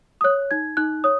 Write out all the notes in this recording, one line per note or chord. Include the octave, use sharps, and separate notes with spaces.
D#6
C#5 F#6
D#4 G#6
D#4 F#6
C#5 D#6